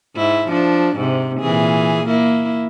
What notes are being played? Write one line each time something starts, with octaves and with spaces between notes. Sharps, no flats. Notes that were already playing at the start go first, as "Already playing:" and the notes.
G#2 E4
F3 D4
G#2 C3
A#2 E3 G#4
A#3 E4